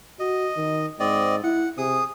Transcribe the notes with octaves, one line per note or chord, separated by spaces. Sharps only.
F#4 D#5
D#3
G#2 C4 D5 D#5
E4 F#5
C3 G#4 D#6